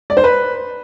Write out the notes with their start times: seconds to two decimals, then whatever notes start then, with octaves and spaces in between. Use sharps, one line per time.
0.10 D5
0.17 C5
0.24 B4